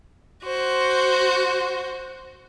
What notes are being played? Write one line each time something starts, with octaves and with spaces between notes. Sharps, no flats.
F#4 C5